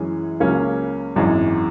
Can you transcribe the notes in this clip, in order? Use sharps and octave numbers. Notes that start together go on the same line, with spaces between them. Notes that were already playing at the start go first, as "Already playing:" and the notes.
Already playing: F#2 E3 G#3 C#4 G#4
C#2 C#3 F#3 A#3 C#4
G#1 F#2 E3 G#3